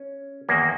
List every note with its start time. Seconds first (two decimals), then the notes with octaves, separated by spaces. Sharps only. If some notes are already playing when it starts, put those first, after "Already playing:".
Already playing: C#4
0.49 E2 D#3 A#3